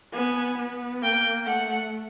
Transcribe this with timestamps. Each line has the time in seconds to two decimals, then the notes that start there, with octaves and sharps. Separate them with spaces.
0.13 B3 G#5
0.58 B3
1.02 A#3 G5
1.46 A3 F#5